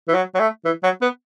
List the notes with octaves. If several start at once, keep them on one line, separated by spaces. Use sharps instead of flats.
E3
F#3
F#3
A3
E3
F#3
B3